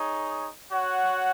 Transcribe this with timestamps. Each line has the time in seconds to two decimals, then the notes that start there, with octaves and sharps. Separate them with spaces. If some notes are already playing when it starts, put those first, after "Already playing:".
Already playing: D#4 G#4 C#5
0.71 F#4 C#5 F#5